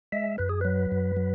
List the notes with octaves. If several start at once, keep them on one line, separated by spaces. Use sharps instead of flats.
G#3 E5
F#2 B4
G#4
F#3 B4
F#2
F#3